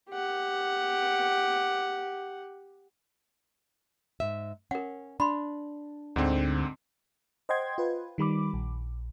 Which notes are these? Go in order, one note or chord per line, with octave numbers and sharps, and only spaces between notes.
G4 F#5
G#2 E5
C#4 A#4 F#5
D4 B5 C6
D2 G#2 D3 C4
C5 D#5 F#5 G5 C6 G#6
F4 B4
D#3 G3 B5 D6
A#1